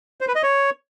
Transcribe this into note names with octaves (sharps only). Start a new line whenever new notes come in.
C5
B4
D#5
C#5